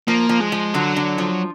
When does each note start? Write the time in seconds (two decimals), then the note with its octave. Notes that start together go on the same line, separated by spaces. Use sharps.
0.08 F3 A#3
0.29 F3
0.41 G#3
0.52 F3
0.74 D3 F#3
0.96 D3
1.18 F3